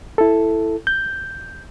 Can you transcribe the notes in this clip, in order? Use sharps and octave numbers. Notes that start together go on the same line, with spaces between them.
E4 A4
G6